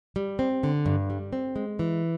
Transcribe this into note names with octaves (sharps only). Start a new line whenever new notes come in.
G3
C4
D3
G2
G3
C4
G#3
E3